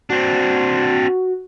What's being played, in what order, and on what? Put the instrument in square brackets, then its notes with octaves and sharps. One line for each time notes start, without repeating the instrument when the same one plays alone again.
[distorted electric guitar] C4 D4 [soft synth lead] F#4